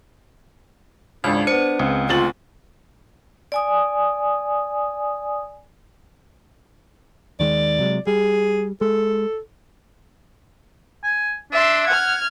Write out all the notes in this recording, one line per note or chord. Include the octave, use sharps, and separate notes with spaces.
G#1 C#2 D4 G#6
B3 C5 C#7
C#2 C4
D2 F4 A6 F#7
D5 G#5 D#6
D#2 D#3 G#3 D5
C3 F#3 G#3
G3 G#4
G#3 A4
G#5
D4 E5 C6
F#5 F6 G#6